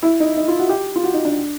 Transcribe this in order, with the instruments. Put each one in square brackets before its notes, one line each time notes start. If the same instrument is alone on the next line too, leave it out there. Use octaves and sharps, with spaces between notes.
[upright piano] E4
D#4
D#4
F4
F#4
G4
F4
F#4
D#4
D4